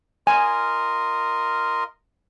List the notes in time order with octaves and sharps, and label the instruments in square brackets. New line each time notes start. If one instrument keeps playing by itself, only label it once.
[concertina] F4 A#4 D#5 [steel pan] G#5